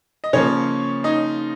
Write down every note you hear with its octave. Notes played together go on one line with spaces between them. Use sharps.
D#5
C#3 F3 A#3 C#4 C#5
D#4 D#5